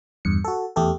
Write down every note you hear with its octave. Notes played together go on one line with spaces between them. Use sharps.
E2 G2 C#7
F#4 A4
E2 A3 G4 A4